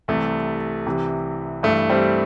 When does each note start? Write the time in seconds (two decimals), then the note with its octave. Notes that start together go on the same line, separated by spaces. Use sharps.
0.08 C2 C3 E3 A3
0.86 C2 C3 E3
1.63 G2 A3
1.67 E3
1.90 G3 C4